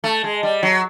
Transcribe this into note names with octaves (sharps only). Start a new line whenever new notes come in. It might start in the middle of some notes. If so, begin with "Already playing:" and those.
A3
G#3
G3
F#3